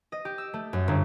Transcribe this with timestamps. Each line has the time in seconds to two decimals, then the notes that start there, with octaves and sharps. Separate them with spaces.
0.12 D#5
0.25 G4
0.38 E6
0.53 A3
0.73 F#2
0.88 G1